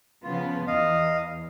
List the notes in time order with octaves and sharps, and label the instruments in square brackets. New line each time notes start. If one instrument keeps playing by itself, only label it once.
[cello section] C#3 F3 B3 [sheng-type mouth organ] F4
[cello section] E2 [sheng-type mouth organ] D#5 F5